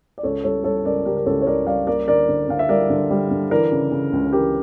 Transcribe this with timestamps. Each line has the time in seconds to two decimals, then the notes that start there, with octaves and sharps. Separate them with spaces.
0.18 D5
0.23 C#2 A4 C#5
0.44 G3 A4 C#5
0.64 G3 A4 C#5
0.85 C#2 A#4 D5
1.05 C#3 G4 A#4
1.17 A#4
1.26 C#2 A4 C#5
1.42 C#5
1.47 C#2 A#4 D5
1.66 G3 D5 F5
1.87 A#3 A#4 D5
2.08 D3 A#4 D5
2.29 D3
2.49 D3 F5
2.59 E5
2.69 G3 A#4 D5
2.90 D3
3.10 G3
3.31 D3
3.51 E3 A#4 D5
3.72 C#3
3.92 C#3
4.12 C#2
4.33 E3 G4 A#4